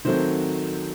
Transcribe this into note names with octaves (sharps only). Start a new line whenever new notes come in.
D#3 F#3 A3 C4 C5